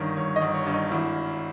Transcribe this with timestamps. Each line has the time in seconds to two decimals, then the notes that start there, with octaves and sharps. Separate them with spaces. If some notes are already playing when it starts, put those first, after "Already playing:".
Already playing: G1 G2 D#3 C#5
0.17 G1 C#5
0.36 D#5
0.41 G1
0.54 C#5
0.66 G2
0.73 D#4
0.91 G#1 E4